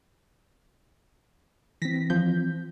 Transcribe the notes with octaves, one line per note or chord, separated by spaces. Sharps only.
E3 C4 A#6 B6
F3 G6